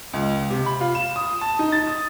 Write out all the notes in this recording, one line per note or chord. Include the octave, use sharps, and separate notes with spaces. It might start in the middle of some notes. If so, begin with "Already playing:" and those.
C#2
C3
B5
F4
E7
D#6
A5
D#4
A6
D#6